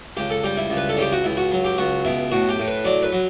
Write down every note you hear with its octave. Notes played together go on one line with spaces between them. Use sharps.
C#2 G4
A4
G3 G4
E4
C#2
B4
A4
C#3 G4
F#4
C#2 E4
F#4
F#3
G4
C#2 F#4
B2 E4
A2 F#4
G4
A2
B4
F#3 D5
B4
F#3